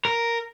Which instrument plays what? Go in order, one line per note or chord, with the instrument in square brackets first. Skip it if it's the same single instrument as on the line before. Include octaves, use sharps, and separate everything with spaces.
[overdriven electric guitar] A#4